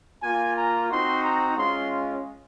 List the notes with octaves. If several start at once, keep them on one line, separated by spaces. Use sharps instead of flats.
A#3 F4 G#5
A#5
C4 D#4 F#4 C6
A#5
G#3 C#4 F4 C6